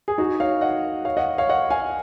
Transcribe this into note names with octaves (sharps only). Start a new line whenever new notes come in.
G#4
D#4 F#4
C#5 F5
D#5 F#5
C#5 F5
D#5 F#5
C#5 F5
D#5 F#5
F5 G#5